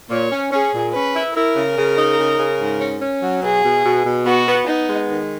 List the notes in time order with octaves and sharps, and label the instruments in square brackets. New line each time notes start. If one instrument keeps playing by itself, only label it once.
[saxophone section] A#2 [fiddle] C#5
[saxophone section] C#4
[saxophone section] C#4 [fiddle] G#4
[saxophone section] A#2
[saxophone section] C#4 [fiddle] B4
[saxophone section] E4
[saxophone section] E4 [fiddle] A#4
[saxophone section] C#3
C#3
D#4
C#3
C#3
G#2
C#4
C#4
F#3
[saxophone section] B2 [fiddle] G#4
[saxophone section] B2
B2
B2
[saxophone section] B3 [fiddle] F#4
[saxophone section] B3
[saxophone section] B3 [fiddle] D#4
[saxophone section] G#3
D#3